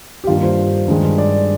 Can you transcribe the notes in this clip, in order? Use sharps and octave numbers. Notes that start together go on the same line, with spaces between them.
G4
G2 D#3 G3 A#3 F4
C5
G2 D#3 G#3
D5